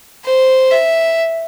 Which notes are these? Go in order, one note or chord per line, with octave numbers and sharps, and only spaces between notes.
C5
E5